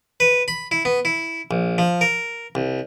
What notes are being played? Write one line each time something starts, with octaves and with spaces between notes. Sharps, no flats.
B4
B5
E4
B3
E4
A#1
F3
A#4
C2